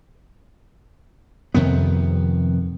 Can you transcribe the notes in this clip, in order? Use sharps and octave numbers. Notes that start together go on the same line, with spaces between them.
F2 C3 D#3 B3